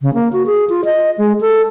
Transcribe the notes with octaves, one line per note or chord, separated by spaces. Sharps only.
C#3
A#3
F#4
G#4
F4
D#5
G#3
A4